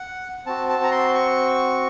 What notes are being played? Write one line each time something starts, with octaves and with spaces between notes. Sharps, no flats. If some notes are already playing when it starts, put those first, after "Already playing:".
Already playing: F#5
C4 F#4 A5
A5
A#5
C6
C#6